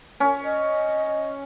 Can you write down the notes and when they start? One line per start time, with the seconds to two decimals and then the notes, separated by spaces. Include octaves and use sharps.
0.20 C#4
0.44 D#5